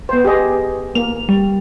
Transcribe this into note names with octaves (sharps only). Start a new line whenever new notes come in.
B3 C5
G4 G#4 D#5
A#3 F7
G3